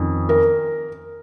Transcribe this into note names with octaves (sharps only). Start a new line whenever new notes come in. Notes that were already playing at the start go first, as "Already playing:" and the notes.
Already playing: F2 D#3 C#4
A#4